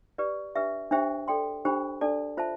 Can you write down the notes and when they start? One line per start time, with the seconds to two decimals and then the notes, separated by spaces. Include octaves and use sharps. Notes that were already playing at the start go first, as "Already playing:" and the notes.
0.18 G4 B4 D5
0.56 D4 G4 B4 E5
0.91 D4 G4 C5 E5 G5
1.28 A4 D5 G5 C6
1.65 D4 G4 C5 G5 B5
2.01 D4 A4 D5 A5
2.37 F4 C5 E5 A5